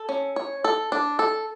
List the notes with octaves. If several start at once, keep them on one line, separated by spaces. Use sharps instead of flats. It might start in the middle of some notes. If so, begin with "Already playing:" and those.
Already playing: A4
C#4
C#5
A4
D4
A4